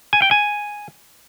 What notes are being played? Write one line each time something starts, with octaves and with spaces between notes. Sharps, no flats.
G#5
G5
G#5